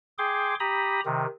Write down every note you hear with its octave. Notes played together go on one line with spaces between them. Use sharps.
G#4 G5 C6 D6
G4 A#5 B5 D#6
C3 D#3